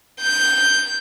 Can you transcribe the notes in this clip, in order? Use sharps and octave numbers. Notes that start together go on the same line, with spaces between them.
G6